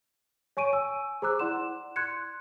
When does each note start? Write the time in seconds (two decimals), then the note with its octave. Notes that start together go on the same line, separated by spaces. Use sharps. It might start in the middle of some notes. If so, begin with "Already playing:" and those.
0.57 C#5 G#5 C#6 D7 D#7
0.73 G#5 E6
1.22 G#4 C5 A#5 D6 E6 F#6
1.39 E4 D5 F#5 C6 E7
1.96 C6 F#6 G#6 C#7